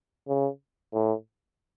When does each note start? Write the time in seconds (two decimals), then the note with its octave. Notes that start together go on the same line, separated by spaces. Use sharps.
0.28 C#3
0.93 A2